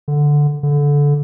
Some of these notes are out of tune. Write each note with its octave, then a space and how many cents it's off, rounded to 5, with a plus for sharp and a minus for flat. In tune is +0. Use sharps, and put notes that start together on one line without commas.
D3 +0
D3 -20